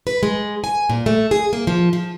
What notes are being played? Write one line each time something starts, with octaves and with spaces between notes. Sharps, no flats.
B4
G#3
G#5
A#2
A3
G#4
A#3
F3
F3